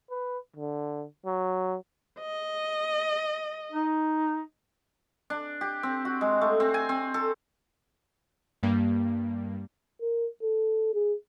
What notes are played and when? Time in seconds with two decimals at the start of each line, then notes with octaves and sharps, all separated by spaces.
0.11 B4
0.56 D3
1.26 F#3
2.20 D#5
3.72 D#4
5.30 D4
5.61 G4
5.83 C4
6.05 F#4
6.21 G#3
6.41 A3
6.60 C4
6.74 G#5
6.89 C4
7.14 A4
8.63 G2 G3 A#3
10.02 A#4
10.43 A4
10.94 G#4